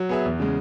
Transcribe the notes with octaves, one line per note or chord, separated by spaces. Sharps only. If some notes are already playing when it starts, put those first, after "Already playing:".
Already playing: F#3
B3 G#4 E5
E2
C#3 G#3